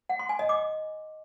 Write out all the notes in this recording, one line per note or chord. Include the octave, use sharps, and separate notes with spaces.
F#5
C6
G#5
D#5
D6